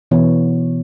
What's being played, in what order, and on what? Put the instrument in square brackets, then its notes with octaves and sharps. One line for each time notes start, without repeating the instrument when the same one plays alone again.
[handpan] B2 E3 B3 C#5